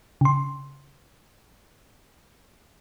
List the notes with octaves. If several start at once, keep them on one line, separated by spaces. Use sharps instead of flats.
C#3 C6